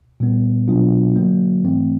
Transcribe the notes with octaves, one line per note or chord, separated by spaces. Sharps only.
A#2 G3 B3
B2 F#3 B3 D4 F4
D3 F#3 A#3
G#2 E3 A3 C4